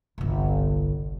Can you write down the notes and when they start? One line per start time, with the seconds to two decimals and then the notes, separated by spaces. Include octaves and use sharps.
0.18 G1 C2